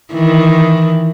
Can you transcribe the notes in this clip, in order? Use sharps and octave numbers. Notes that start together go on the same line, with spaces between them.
D#3 E3